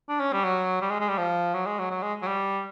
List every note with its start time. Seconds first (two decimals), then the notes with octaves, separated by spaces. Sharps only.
0.09 D4
0.20 C#4
0.33 G3
0.45 F#3
0.82 G3
0.90 G#3
1.00 G#3
1.09 G3
1.18 F3
1.54 F#3
1.66 G#3
1.79 F#3
1.91 F#3
2.03 G#3
2.22 F#3
2.27 G3